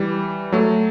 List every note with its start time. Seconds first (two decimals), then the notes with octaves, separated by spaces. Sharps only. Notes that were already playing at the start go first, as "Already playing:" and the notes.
Already playing: E3 G3
0.52 F#3 A3